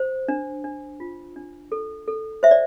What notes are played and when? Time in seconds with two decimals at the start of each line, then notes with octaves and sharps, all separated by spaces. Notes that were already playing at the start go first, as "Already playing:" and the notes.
Already playing: C5
0.28 D4
0.64 D4
1.00 F4
1.36 D4
1.72 A4
2.07 A4
2.43 C5 E5
2.51 D5